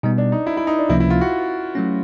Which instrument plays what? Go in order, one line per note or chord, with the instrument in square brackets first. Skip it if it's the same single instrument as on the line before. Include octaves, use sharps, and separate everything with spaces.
[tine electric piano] B2 G3 B3 [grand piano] D#4
[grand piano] D4
D#4
E4
E4
D#4
D4
[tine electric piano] C#2 C3 F3 A#3 C#4 [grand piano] E4
[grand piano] E4
F4
F#4
[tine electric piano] F#3 A3 C#4